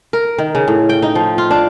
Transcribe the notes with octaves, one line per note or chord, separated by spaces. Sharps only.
A#4
D#3
C#3
A2
G5
D#4
F3
F4
D4